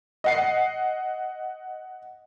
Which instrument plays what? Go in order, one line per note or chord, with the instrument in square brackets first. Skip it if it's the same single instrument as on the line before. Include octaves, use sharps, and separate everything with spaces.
[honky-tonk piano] D#5 F#5 C7